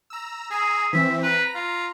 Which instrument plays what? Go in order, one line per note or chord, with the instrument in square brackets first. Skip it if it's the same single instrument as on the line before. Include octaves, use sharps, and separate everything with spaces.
[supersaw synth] A#5 E6
[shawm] G#4 [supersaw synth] G#5 A#5 E6
[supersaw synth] E3 C4 [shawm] E5
[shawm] B4 [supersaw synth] A#5
[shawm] F4